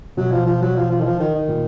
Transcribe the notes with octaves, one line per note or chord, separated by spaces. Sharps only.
B2 F#3
F3
F3
F#3
F3
F3
D#3
F3
D#3
D#3
A#2